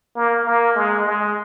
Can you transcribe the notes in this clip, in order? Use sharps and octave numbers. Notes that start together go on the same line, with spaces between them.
A#3
A#3
G#3
G#3